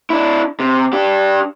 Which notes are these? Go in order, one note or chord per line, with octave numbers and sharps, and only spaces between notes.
D4 E4
C3
D4 G4